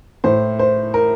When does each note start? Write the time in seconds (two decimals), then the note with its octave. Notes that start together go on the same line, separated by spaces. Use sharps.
0.24 A2 C5
0.59 C5
0.94 A#4